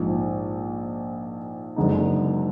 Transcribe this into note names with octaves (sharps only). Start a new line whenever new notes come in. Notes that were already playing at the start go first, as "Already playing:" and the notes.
Already playing: A#1 G#2 F3
F#1 F#2 D3 G#3 D#4